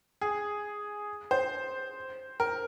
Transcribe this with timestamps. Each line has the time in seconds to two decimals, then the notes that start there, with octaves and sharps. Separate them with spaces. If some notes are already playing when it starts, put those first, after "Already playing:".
0.21 G#4
1.31 C5
2.40 A#4